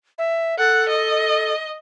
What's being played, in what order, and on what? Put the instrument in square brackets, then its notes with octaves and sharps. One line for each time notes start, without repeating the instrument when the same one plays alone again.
[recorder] E5
[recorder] A4 [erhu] F#5
[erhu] D#5